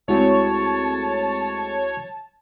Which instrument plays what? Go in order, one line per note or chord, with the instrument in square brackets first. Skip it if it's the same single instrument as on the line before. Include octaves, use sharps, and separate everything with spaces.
[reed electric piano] C#2 E4 F#4 [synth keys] G#3 A3 C4 [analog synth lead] C#5 [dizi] A5